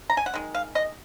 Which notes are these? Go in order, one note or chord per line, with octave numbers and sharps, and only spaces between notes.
A#5
G#5
F#5
D#3 G#3
F5
D#5